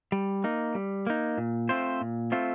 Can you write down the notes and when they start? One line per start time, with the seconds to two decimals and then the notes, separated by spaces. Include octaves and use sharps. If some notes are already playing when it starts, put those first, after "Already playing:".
0.12 G3
0.44 A#3 D#4
0.75 G3
1.07 A#3 D#4
1.38 A#2
1.69 A3 C4 F4 C5
2.01 A#2
2.32 A3 C4 F4 C5